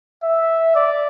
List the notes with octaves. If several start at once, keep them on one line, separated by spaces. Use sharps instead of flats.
E5
D5